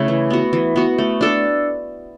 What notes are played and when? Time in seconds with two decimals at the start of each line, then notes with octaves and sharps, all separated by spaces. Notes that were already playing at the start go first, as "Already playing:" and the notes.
Already playing: C#3 A3 E4
0.08 E3
0.30 B3 F#4
0.53 E3
0.76 B3 F#4
0.98 A3
1.21 D4 A4